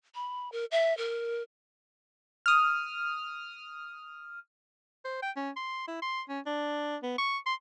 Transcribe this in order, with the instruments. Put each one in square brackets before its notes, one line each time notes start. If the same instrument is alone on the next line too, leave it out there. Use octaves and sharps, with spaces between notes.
[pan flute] B5
A#4
E5
A#4
[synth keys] D#6 F6
[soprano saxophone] C5
G5
C#4
C6
E4
C6
C#4
D4
B3
C#6
C6